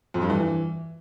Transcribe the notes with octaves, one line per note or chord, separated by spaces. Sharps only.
F2
G2
E3